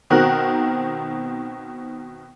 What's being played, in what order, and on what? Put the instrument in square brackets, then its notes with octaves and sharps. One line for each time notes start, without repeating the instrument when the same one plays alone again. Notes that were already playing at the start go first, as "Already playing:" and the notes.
[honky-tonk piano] B2 D#3 C4 F#4 A#4 F#6